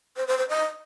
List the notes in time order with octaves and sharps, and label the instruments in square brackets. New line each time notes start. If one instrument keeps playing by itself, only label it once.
[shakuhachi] C5
C5
C5
D#5